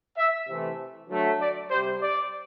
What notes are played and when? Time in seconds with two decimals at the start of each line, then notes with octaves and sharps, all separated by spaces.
0.17 E5
0.48 C3 E3 A3
1.09 D3 F#3 A3
1.40 D5
1.70 C3 G3 C5
2.01 D5